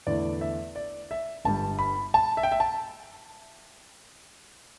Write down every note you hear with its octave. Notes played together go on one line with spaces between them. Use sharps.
E2 D3 A3 E4 D5
E5
D5
E5
G1 G2 G3 A5
B5
A5
E5
G5
E5
A5